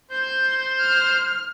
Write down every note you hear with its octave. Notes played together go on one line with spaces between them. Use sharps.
C5 G6
F6